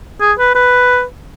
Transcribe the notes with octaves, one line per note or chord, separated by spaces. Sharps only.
G#4
B4
B4